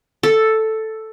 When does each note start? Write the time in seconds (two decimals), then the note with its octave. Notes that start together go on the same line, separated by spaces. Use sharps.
0.23 A4